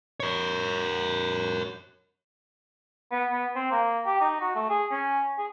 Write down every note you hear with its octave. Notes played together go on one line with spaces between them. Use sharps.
A#4 C#5
B3
B3
C4
A#3
G4
D#4
F#4
A3
G#4
C#4
G#4